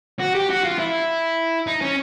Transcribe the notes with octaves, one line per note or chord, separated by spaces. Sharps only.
F#4
G4
F#4
F4
E4
D#4
C#4